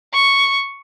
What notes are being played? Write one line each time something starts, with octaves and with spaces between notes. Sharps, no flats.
C#6